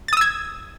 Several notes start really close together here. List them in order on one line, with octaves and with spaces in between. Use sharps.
A6 D#6 E6 G#6